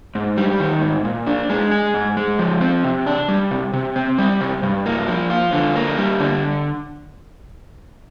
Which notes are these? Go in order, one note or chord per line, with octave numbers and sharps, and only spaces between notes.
G#2
G3
D#3
G#2
A#2
D4
G#3
G#4
G#2
G#3
F3
C4
C3
D4
G3
C3
C3
C4
G3
C3
G2
A#3
F3
F4
D3
A#3
G3
D3